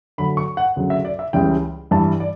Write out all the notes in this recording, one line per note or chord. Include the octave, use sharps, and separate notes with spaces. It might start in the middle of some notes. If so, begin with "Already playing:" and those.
D2 D3 F#3 B5
C#6
F#5
D2 C#3 F#3
E5
D5
E5
C#2 C#3 E3 G3 G5
G2 E3 G3 A5
D5